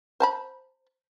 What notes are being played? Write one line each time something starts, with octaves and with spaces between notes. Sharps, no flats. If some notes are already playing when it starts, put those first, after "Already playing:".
C5 A5 B5